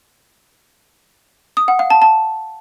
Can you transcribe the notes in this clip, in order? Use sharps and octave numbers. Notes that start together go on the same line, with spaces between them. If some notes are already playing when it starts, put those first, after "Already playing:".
D#6
F#5
F5
A5
A5